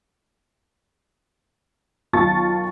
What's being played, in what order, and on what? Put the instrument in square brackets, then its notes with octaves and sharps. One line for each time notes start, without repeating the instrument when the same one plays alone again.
[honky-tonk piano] B1 D#3 F4 A5 C#6 A6